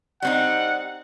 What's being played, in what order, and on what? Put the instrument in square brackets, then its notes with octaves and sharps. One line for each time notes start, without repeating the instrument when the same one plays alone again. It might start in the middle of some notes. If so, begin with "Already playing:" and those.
[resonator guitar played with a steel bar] G3 C4 D#4 [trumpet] F#5